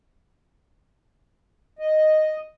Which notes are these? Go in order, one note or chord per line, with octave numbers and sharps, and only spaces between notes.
D#5